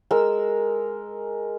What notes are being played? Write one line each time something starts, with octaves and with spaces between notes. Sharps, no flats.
G#3 A#4 E6